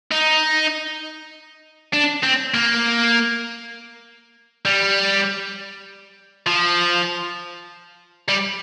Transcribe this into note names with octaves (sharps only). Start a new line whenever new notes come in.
D#4
D4
C4
A#3
G3
F3
G3